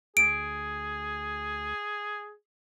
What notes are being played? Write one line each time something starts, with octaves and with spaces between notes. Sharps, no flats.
D2 G#4 D7